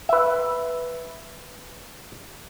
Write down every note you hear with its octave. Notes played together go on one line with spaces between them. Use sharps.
B4 E5